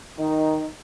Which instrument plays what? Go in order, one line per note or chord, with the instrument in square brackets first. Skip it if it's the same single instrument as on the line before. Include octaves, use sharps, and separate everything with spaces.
[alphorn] D#3 [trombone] D#4